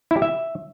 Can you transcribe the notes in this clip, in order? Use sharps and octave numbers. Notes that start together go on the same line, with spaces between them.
E4
G4
E5